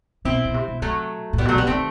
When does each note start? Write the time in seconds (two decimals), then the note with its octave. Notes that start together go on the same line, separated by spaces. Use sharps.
0.25 B2 C4 E4
0.45 B2
0.54 C3
0.68 B2
0.82 C3 F#3 A3
1.33 A2
1.38 G3 B3
1.45 B2 F#3 A3
1.56 C3 G3 B3
1.67 D#3 A3 C4